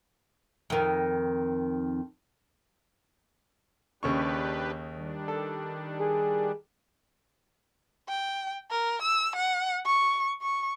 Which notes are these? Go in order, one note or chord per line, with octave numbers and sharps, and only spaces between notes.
F2 D#3
D#2 C#3 D4 G4 B4 C#6
D#3 G3 D4
A4
G#4
G5
A#4
E6
F#5
C#6
C#6